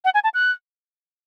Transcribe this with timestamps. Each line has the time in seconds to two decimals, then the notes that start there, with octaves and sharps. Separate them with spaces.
0.05 F#5
0.14 G#5
0.24 A5
0.34 F#6